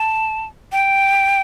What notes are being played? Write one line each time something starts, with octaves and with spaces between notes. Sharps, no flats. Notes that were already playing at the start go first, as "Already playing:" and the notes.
Already playing: A5
G5